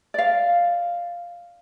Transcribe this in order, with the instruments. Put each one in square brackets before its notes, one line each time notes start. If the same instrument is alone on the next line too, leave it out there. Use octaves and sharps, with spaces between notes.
[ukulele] D5 F5